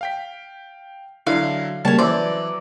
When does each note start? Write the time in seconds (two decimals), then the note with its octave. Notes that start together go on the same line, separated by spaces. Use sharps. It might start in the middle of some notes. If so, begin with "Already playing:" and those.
0.01 F5 G5 B6
1.27 D3 F#3 E4 F5
1.85 C#3 G3 A#3 C#4 C#5 A5
1.99 E3 F#3 C4 C5 D5